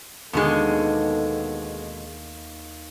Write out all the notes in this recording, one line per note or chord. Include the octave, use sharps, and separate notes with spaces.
D#2 B2 D3 G#3 B3 G#4 A4